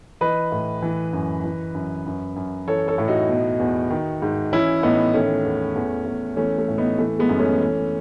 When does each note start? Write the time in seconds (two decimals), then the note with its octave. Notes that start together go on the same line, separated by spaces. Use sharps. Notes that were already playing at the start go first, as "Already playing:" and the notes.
0.21 E3 B4 D#5
0.52 A2
0.82 E3
1.13 F#2
1.44 E3
1.75 F#2
2.06 F#2
2.36 F#2
2.67 E3 A4 C#5
2.88 A4 C#5
2.98 A2
3.08 D#4 F#4
3.29 B2
3.60 E2
3.90 D#3
4.22 G#2
4.52 E3 C#4 E4
4.83 A2 B3 D#4
5.14 D#3 A3 C#4
5.45 E2
5.76 E2
6.06 E2
6.37 E3 A3 C#4
6.58 A3
6.68 A2
6.78 B3 D#4
6.98 E3 A3
7.19 G#3 B3
7.29 F#2
7.39 A3 C#4
7.60 E3